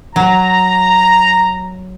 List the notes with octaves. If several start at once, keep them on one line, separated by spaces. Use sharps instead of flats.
F#3 A#5